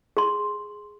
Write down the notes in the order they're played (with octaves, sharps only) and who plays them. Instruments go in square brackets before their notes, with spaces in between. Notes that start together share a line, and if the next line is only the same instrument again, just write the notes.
[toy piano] G#4 C6